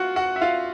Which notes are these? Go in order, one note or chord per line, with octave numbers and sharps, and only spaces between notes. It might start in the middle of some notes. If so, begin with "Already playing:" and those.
Already playing: F4 F#4 F#5
F#4 F#5
E5
F4 F5